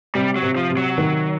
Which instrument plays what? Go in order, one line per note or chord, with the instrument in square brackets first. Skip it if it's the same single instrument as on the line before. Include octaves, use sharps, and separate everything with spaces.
[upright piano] C3 [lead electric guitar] G3
[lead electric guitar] F#3
[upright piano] C3
[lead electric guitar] F3
[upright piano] C3
[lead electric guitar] F#3
[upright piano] D#3